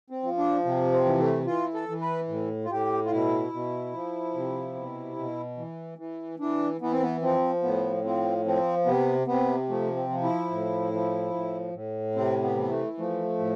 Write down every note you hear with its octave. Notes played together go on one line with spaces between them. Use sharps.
C4
F3
D4
C3
C4
E3
A3
E3 F4
A4
E3
B4
A2
F4
A2 G4
F4
B2 E4
B2
F3
C3
B2
B2
E3
E3
E3 D4
E3 B3
C4
B3
F3 C4
A2 B3
F3 C4
F3 C4
C3 B3
C3 B3
F3 A3
C4
F3
E4
A2
F3
A2
A2
C3 C4
B3
E3 B3
A3
F3 A3
A2